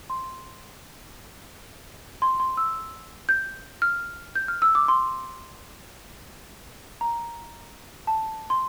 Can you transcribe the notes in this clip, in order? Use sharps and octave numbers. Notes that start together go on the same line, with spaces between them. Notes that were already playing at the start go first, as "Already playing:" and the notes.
C6
C6
C6
E6
G6
F6
G6
F6
E6
D6
C6
A#5
A5
C6